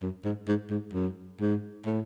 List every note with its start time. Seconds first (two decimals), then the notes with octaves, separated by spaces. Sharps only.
0.02 F#2
0.25 G#2
0.48 G#2
0.70 G#2
0.93 F#2
1.40 G#2
1.86 A2